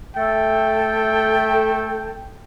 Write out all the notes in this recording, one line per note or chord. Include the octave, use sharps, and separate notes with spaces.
A3 A4 G5